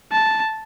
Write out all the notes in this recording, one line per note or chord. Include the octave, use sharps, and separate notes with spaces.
A5